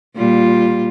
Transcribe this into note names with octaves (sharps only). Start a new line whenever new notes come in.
A#2 G3 F4